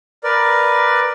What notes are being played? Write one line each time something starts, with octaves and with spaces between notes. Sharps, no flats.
A#4 B4 D5